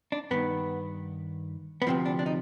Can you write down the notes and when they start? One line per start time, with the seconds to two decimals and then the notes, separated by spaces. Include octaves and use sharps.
0.12 D4
0.31 G2 D#3 B3
1.82 B3
1.87 D2 C3 F3 C4
2.06 D4
2.19 D4
2.26 D#4